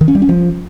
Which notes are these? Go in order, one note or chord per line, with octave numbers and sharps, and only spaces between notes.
D#3
C#4
G3
C#4
F3